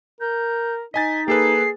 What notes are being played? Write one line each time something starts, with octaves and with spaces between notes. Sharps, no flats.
A#4 G6
D#4 D#5 G#5 A6 B6
A#3 G#4 A4 B4 C7